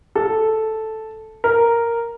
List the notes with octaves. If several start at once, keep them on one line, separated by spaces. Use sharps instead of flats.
A4
A#4